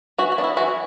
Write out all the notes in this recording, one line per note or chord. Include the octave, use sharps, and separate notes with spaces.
E3 F#4
F#4
B3 D4
E4
E3 F#4